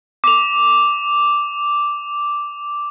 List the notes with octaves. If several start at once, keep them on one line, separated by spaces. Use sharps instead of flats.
D6 F7